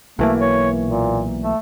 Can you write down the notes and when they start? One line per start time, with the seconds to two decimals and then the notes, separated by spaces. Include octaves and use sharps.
0.19 B1 E3 A3 A#3
0.40 C#5
0.84 A#2
1.42 A3